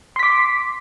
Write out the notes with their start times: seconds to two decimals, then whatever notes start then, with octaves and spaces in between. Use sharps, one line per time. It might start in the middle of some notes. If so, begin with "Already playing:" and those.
0.16 C6
0.19 B6
0.23 D6